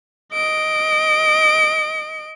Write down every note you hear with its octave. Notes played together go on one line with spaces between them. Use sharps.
D#5 D7